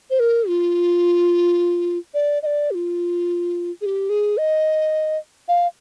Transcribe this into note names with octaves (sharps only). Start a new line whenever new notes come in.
C5
A#4
F4
D5
D#5
D5
G4
F4
G#4
G4
G#4
D#5
F5